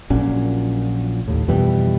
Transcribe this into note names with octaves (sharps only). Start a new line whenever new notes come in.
A#1 A#2 F#3 C#4
D#2 A2
F2 B2 E3 G3